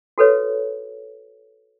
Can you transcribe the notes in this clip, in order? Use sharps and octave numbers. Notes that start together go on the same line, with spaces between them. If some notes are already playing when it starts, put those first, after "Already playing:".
F#4 A4 B4 C#5